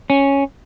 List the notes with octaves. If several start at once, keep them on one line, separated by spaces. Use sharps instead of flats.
C#4